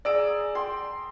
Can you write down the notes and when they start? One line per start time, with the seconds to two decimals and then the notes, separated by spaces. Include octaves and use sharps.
0.05 G#4 D5 A#5 E6 D7
0.55 G5 C6